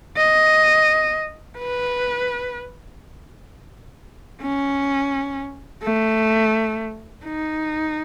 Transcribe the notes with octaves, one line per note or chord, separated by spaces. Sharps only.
D#5
B4
C#4
A3
D#4